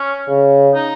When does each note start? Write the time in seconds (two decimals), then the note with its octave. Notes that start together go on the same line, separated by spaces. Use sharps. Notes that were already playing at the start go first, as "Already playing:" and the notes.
Already playing: C#4
0.28 C#3
0.75 D#4